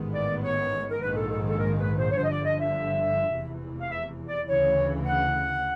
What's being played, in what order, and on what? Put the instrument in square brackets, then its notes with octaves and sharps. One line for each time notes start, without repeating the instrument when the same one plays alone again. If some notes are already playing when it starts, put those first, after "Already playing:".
Already playing: [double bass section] A1 G#2 D#3 G#3 B3
[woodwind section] D5
C#5
A#4
[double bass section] A#1 G#2 D#3 G#3 [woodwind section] B4
[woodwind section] A4
A4
A4
A#4
B4
C5
C#5
[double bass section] G1 G2 D3 F3 [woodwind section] C5
[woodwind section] D#5
D5
D#5
E5
[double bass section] F1 E2 C3 E3
[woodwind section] F5
E5
D5
[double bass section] D2 C#3 E3 [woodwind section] C#5
[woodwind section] F#5